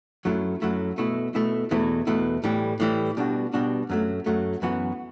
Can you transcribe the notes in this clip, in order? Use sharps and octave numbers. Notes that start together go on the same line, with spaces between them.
F#2 F#3 A3 E4
F#2 F#3 A3 E4
B2 A3 E4
B2 A3 E4
E2 B2 A3 E4
E2 B2 A3 E4
A2 E3 G3
A2 E3 G3
B2 G3 D4 F#4
B2 G3 D4 F#4
F#2 F#3 A3
F#2 F#3 A3
F#2 E3 B3 F#4